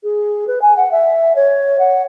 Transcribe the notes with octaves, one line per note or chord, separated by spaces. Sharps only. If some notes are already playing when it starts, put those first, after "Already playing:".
G#4
B4
G#5
F#5
E5
C#5
F#5